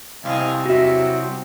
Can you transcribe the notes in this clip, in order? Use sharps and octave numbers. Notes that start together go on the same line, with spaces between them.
C2 C4 D#5 F5 G#5
F#3 F#4 E5